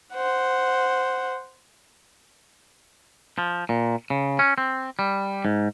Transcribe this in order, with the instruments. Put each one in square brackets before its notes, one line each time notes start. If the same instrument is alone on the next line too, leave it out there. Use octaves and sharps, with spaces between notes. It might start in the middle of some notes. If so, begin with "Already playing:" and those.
[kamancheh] C5 F#5
[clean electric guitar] F3
A#2
C#3
C#4
C4
G3
G#2